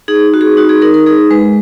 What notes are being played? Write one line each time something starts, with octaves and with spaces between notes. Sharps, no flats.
D#4 G#4
F#4
G#4
D#4 F#4
G#4
D#4 A#4
A#4
D#4 G#4
G#3 B4